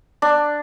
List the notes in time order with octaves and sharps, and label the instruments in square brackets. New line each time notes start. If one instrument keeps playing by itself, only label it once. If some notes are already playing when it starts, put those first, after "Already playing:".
[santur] D4